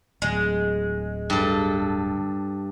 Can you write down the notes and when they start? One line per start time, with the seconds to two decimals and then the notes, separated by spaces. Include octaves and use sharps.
0.22 D1 G#3
1.30 G2 A4